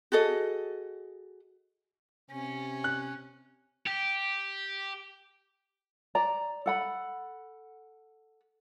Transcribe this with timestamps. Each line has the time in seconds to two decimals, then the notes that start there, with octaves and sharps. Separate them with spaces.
0.12 F#4 G#4 A4 D#5
2.31 C3 C#4
2.84 F#6
3.86 G4
6.15 D5 A#5
6.66 A4 F#5 B5